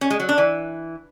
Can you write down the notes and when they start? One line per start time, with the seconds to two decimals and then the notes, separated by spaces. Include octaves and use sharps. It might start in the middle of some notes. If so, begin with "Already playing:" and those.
0.01 C#4
0.10 G#3
0.20 F#3
0.29 D4
0.38 E3